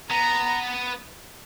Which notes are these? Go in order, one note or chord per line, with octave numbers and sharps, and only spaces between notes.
B3 A#5